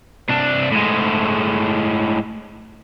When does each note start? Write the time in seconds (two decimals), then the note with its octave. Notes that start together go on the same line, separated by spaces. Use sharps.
0.30 C2 D4
0.72 A2 G#3